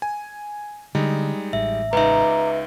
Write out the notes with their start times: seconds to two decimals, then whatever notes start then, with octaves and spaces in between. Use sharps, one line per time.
0.02 G#5
0.95 D3 G3 G#3 D#4
1.53 A1 E5
1.93 C#2 D#4 B4 E5 A#5 D6